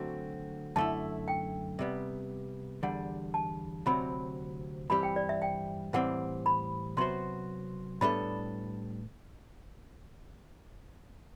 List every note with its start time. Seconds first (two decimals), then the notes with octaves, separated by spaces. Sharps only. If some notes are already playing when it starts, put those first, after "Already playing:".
Already playing: D3 F#3 A3 C4 F#4
0.76 F#2 D3 A3 E4 A5
1.28 G5
1.79 C3 G3 B3
2.83 E2 D3 G3 F#5
3.34 A5
3.86 D2 C3 F#3 C4 B5
4.90 G2 E3 G3 C4 G4 B5
5.03 G5
5.16 D5
5.29 E5
5.42 G5
5.93 A2 E3 G3 C4 F#5
6.46 B5
6.97 C3 F#3 B3 F#4 C5 C6
8.01 A2 G3 B3 D4 A4 B5